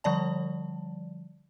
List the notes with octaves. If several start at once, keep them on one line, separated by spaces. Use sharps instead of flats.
D3 F3 G3 D5 A5